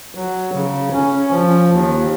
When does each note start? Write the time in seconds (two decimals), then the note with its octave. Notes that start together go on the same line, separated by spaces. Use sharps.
0.15 F#3
0.53 C#3
0.93 C#4
1.31 F3
1.70 D#2